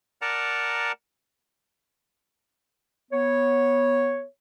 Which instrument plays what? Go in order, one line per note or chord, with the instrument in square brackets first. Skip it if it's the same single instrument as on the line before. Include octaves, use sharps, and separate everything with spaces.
[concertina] A#4 D5 F#5 A5 A#5
[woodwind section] B3 C#5